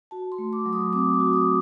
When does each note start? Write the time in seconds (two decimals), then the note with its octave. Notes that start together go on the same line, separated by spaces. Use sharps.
0.11 F#4 A5
0.32 C6
0.38 A3
0.53 D6
0.66 F#3
0.73 D#6
0.93 C4 D6
1.14 D6
1.20 F#4
1.33 D#6